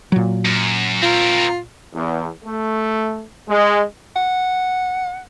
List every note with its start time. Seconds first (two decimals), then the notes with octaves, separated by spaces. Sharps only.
0.12 A#2 F#3
0.45 F#2
1.02 C4 F4 A#4
1.94 E2
2.44 A3
3.48 G#3
4.16 F#5